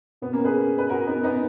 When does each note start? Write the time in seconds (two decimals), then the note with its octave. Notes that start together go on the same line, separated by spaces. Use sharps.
0.22 B2 B3
0.33 A#3 C#4
0.44 G#4 B4
0.78 B4
0.89 F#4 A#4
1.07 B3 D#4
1.24 B3 D#4